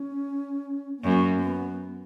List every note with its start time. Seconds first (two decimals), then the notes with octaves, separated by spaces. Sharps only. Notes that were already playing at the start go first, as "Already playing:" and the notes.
Already playing: C#4
0.98 B3
1.03 F#2 A#3
1.37 A#3
1.42 B3